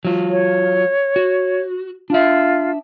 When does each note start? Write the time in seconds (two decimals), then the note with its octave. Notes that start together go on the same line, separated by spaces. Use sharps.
0.05 F#3 F4
0.31 C#5
1.16 F#4
2.10 D4 F4 E5